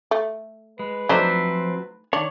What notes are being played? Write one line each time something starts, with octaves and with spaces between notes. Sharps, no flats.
A3
G#3 B4
F3 F#3 A3 C4 D4 D#4 C5 E5
D#3 D4 C#5